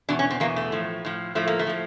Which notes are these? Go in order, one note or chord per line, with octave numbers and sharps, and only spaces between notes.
E2 B2 D4
C#4
C4
E2 B2 A#3
A3
A2 F3
A2 F3
A2 F3 A3
A#3
A3
A2 F3